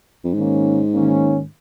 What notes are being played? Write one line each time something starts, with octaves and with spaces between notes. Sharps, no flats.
F2
G#2 D#3 A#3 C#4
D#3 A#3 C#4